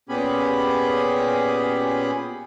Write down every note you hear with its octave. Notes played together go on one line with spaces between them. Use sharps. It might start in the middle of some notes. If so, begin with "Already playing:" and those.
A#2 B3 C#4 G4 G#4 B5